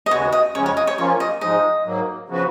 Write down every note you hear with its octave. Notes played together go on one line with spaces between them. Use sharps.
D#5
D#2 C#3 G#3 B3 F#4 C#5
D#5
F2 C#3 G#3 C#4 C#5
C#5
D#5
C#5
F3 A#3 C#4 F4 C#5
D#5
G#2 F3 G#3 D#4 D#5
G#2 F#3 A#3
C#3 F3 B3 F#4 B4